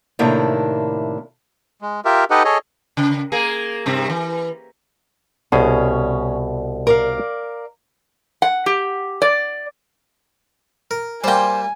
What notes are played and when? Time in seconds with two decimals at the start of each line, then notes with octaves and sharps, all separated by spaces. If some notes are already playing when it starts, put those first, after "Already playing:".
0.19 A2 C3 D#3 A#3 D4 E4
1.82 G#3
2.05 F4 G4 A#4 E5
2.31 D#4 G4 A4 B4 D#5 F#5
2.45 G#4 A4 C#5 D#5
2.97 C#3
3.32 A#3 G#4
3.86 G2 C3 C4
4.10 E3
5.52 C2 B2 C#4 G#4
6.87 A#4 D5 F5
8.42 F#5
8.66 G4
9.22 D5
10.91 A#4
11.24 G3 A#3 C5 G5 G#5